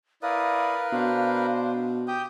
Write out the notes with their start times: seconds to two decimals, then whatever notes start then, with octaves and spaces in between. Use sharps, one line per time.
0.23 E4 A#4 B4 D5 F5 D#6
0.93 B2 D4 C5
2.08 G4 G5 D#6 G6